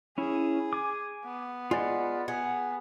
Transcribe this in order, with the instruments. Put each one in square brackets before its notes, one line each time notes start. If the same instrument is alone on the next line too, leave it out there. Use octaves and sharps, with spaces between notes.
[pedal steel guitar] C#4 E4 [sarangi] G#4
[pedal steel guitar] G#5 D6
[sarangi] B3
[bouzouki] G#3 [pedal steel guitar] F4 D5 F#5
[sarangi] B3 [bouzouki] G#4 [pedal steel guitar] F#5